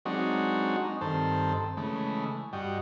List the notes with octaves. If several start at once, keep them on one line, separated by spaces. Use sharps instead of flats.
F#3 G#3 C4 D4 D#4 F#4
D#4
G2 D#3 C4 A4 C5 A5
C#3 E3 G#3 A3
G2 G3 F#4 D#5 G5